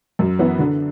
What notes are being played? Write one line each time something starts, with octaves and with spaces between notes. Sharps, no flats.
F#2
E3 B3 E4
D3